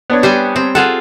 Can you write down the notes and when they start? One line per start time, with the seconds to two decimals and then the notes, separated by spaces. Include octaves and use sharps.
0.10 B3 D4 C#5
0.23 G3 C5 G#5
0.56 C4
0.75 F4 G#4 A4 F#5